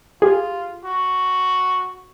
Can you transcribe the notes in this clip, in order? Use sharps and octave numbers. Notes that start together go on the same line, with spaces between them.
F4 G4 G#4
F#4